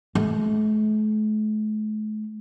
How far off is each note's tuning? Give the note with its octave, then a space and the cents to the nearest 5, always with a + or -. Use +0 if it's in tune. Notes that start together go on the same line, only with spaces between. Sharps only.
A3 -45